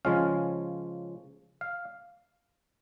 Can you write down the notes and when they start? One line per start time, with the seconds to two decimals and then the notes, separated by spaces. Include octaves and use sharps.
0.05 C#3 F3 G#3 C#4 F5
1.61 F5